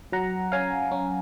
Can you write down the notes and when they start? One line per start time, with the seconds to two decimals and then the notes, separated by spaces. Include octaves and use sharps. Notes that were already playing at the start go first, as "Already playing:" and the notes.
0.12 F#3 F#5 A#5
0.52 C#4 F5 G#5
0.91 C#4